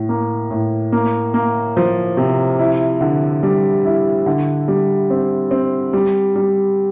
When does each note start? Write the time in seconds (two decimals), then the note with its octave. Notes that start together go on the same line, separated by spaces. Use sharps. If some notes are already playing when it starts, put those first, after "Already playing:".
Already playing: A2
0.09 A#3
0.50 A2
0.92 A#3
1.34 A#3
1.77 F3
2.17 C3
2.59 E4
3.01 D3
3.43 G3
3.85 E4
4.26 D3
4.68 G3
5.10 C4
5.51 C4
5.93 G3
6.35 G3